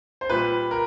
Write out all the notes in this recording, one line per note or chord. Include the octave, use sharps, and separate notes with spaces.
C5
A#2 G3 B4
A#4